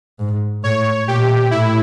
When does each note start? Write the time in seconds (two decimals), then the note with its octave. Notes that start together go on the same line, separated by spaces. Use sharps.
0.20 G#2
0.63 A2 C#5
1.07 A#2 G4
1.51 A2 E4